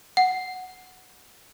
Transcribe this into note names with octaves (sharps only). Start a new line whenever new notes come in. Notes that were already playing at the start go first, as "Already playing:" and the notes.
F#5